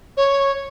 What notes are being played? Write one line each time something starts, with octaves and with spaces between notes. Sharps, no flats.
C#5